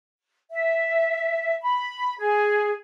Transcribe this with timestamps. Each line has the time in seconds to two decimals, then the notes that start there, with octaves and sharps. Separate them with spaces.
0.51 E5
1.61 B5
2.19 G#4